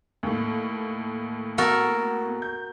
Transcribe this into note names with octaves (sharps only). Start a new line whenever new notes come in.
D#2 A2
B3 F#4 A4 A#4
G6